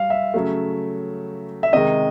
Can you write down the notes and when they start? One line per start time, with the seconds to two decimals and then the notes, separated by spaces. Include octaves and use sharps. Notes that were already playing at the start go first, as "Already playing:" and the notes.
Already playing: G3 F5
0.10 E5
0.34 C#3 F#3 A3
1.63 E5
1.72 C3 D#3 G#3 D#5